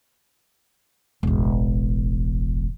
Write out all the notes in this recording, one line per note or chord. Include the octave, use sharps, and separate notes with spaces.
E1 A1